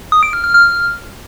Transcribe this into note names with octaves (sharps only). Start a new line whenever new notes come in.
D#6
D7
F6
F6
F6